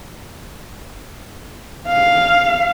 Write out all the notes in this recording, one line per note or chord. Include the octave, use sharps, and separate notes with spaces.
F5